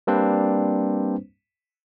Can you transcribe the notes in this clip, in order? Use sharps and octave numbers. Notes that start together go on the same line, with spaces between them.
G3 A#3 C4 D4 B4 C5